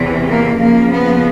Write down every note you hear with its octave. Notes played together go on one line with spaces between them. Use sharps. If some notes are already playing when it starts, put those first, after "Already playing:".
Already playing: E2 C3 E3
A#3
F2 C#3 F3 A#3
B3